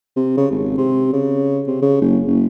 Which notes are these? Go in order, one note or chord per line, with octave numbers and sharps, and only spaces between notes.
C3
C#3
G#1
C3
C#3
C3
C#3
F#1
F#1